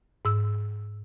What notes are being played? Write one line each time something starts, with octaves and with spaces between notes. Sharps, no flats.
G#2 E6